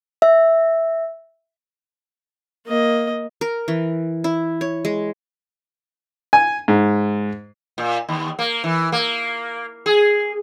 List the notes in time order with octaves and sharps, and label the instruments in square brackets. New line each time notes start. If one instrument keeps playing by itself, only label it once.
[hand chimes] E5
[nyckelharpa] A#3 D#5
[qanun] A#4
E3
E4
C#5
G#3
[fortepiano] G#5
G#2
[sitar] A#2
D#2
A#3
E3
A#3
G#4